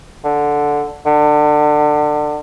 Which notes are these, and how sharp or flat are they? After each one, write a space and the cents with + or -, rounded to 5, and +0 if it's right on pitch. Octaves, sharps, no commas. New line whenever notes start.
D3 -5
D3 +25